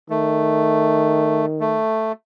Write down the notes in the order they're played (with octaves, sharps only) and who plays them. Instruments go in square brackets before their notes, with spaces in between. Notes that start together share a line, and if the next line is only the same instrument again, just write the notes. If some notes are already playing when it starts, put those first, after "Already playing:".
[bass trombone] D#3 [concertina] A3
[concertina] A3